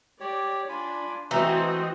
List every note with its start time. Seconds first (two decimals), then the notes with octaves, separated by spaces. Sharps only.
0.20 G4 C#5 D5
0.69 D4 F4 G#5 B5
1.31 E3 A3 C4 D#4 F#4 D#5